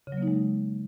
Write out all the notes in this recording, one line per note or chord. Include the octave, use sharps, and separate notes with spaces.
C#3
F#3
A#3
D#4
G#3